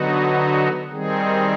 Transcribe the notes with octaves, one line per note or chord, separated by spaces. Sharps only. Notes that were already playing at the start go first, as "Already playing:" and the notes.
Already playing: D3 F#3 B3 D#4 F#4
D#3 G3 C4 D#4 G#4